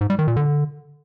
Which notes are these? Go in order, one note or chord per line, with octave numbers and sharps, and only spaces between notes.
G#2
G3
D#3
A#2
D3